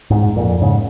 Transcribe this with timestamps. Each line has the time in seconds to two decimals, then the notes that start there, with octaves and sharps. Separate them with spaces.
0.10 G#2
0.36 F2 A#2
0.61 G#2 C#3